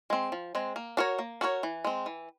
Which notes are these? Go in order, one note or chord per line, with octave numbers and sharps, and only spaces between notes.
G#3 C4
F3
G#3 C4
A#3
D4 F#4 A#4 C#5
A#3
D4 F#4 A#4 C#5
E3
G#3 C4
E3